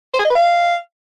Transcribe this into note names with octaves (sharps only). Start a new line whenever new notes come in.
C5
G#4
D#5
B4
F5